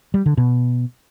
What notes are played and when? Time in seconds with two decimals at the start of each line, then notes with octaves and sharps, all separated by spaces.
0.14 G3
0.26 D3
0.37 B2